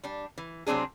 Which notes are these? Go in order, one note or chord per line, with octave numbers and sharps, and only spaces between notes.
G3 D4
E3
C3 F#3 C4 D4 G#4